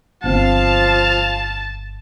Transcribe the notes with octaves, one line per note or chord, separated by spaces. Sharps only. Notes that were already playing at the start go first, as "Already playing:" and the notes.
G1 B2 F3 C4 F5 A5